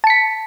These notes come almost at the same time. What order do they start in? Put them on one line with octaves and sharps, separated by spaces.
A5 C#7 B6